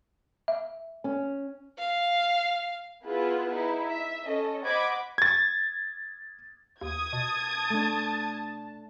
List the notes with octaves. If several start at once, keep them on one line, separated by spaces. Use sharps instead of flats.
E5
C#4
F5
B3 E4 F4 G#4 B4
D#4 E4
E5
C#4 A4 D#5
C5 D#5 F#5 B5 D6 G#6
G#6 A6
D#2 D#6 G#6
B2 A5
A3 D4